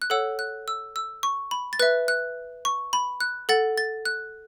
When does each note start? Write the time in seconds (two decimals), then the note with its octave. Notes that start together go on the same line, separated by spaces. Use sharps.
0.02 F#6
0.10 A4 C#5 F#5 E6
0.39 F#6
0.68 E6
0.96 E6
1.23 C#6
1.51 B5
1.73 A6
1.79 B4 E5 F#6
2.08 F#6
2.65 C#6
2.93 B5
3.20 F#6
3.49 A4 F#5 A6
3.78 A6
4.05 F#6